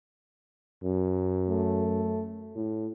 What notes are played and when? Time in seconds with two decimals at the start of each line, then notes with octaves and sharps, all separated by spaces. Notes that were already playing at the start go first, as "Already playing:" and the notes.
0.84 F#2
1.48 A3
2.55 A2